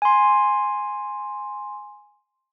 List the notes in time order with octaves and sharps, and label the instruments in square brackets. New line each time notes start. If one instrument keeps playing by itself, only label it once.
[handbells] G#5 C6